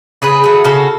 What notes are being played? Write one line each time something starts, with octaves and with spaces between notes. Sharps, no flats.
C#3 G#4 B4
F#3 A3
C#3 F#4 A4